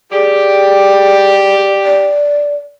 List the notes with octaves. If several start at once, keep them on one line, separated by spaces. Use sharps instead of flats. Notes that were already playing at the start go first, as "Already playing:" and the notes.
G4 G#4 D5
D5